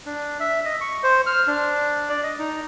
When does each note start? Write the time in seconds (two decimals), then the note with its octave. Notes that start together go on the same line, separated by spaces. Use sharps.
0.06 D4
0.40 E5
0.65 D#5
0.81 C#6
1.03 C5
1.27 F6
1.47 D4
2.09 D5
2.23 D#5
2.39 D#4